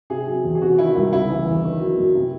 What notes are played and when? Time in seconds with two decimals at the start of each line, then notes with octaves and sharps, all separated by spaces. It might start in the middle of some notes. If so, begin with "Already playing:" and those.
0.10 C3 G#4
0.28 F#3
0.44 E2
0.55 G#4
0.62 C3 F#4
0.78 D#3 E4
0.96 C2 E4
1.12 C#3 E4
1.30 E3
1.47 E2
1.65 D#3
1.81 F#3
1.98 F#2
2.15 C3